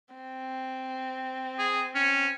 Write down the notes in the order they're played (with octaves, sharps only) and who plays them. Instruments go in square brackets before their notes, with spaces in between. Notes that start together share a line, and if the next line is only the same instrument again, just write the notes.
[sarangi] C4
[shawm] G#4
C#4